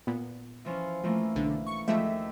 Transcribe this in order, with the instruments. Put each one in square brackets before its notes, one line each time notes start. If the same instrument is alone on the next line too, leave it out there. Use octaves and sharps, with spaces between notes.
[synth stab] A#2 B3
[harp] E3 F3 C#4
[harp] E3 A3 A#3 [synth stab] F3
[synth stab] B1 [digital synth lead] D3
[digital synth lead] C#6
[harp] D#2 [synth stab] F3 G#3 A3 [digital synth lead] E5